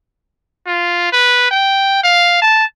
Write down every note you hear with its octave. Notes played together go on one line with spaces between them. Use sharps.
F4
B4
G5
F5
A5